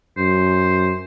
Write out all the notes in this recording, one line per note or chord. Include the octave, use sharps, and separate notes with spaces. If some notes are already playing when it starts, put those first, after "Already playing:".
F#2 C5